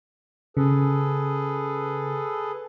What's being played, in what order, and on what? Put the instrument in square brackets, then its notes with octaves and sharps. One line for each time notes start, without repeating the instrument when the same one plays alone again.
[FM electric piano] C#3 [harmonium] G#4 A4 B4